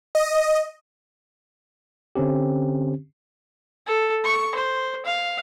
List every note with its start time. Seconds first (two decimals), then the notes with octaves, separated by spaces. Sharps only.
0.15 D#5
2.15 D3 C4 C#4 G4
3.86 A4
4.24 C#6
4.55 C5
5.05 F5